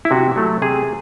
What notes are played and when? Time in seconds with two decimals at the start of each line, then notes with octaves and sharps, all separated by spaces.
0.05 E4
0.11 C3 F#4
0.36 F#3 A3
0.62 C3 G#4